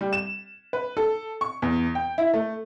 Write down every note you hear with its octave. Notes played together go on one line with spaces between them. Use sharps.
G3
E7
B4
A4
C#6
E2
G5
E4
A3